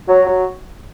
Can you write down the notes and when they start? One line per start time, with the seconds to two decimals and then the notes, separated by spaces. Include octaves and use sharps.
0.08 F#3
0.27 F#3